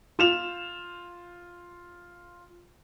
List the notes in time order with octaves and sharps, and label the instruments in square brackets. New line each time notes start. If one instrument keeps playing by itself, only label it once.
[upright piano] F4 E7 F7